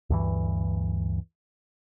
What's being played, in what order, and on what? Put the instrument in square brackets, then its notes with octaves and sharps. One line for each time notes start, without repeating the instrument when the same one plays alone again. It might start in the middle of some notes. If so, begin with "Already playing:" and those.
[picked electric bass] D2 G2 E3